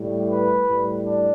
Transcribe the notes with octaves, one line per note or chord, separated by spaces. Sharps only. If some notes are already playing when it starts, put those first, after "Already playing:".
Already playing: A2 G3
B4
A2 G3
D4